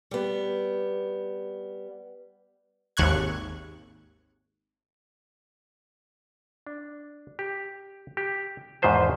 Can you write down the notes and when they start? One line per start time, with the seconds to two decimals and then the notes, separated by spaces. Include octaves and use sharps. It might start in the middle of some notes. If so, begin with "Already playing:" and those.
0.11 G3 B3
2.97 G#1 D#2 C#6 F#6 G#6
6.67 D4
7.39 G4
8.17 G4
8.82 E2 G#2 D#3 B4 C5 A5